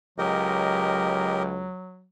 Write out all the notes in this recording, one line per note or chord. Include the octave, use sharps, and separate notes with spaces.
C#2 F#3 G4 A#4 D#5